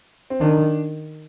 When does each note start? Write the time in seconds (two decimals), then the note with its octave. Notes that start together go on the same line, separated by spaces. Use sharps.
0.30 C4
0.40 D#3 D4